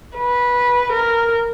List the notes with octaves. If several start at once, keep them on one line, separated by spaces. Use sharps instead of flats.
B4
A#4